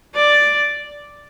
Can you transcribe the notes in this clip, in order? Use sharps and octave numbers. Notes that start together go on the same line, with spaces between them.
D5